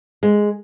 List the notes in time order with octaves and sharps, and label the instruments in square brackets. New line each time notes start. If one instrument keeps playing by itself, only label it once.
[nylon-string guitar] G#3